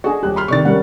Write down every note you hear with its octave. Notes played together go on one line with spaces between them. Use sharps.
D4 F#4 G#4 A4 D#5
D#1 G4 F#6
B5 C6 F6
C3 D#3 A4 D5 C#6 A6
G3 C#4 A#4 F#5